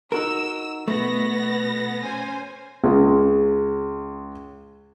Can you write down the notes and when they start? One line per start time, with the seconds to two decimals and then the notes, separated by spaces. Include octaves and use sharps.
0.12 D#4 F#4 A#4 E6
0.88 B2 A3 B3 A#6
2.03 C#4 C5 G#5
2.84 C#2 G#3